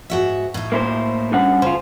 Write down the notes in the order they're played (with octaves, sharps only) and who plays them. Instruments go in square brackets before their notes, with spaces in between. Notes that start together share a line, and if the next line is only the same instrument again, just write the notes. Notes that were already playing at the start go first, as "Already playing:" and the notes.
[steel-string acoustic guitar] G#2 F#4 E5
A2 D#4
[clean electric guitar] A#3 E4 C5
G2 C#4 F#5
[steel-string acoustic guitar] C#3 [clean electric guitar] F4 C5